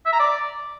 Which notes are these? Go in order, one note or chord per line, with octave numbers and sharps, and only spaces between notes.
E5
A#5
D5